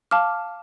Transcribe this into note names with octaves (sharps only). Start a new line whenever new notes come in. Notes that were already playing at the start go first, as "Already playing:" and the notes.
F5 A5 D6 F6